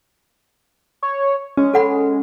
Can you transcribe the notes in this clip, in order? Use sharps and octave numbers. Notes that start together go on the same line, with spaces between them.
C#5
G#3 C#4
A4 F#5 B5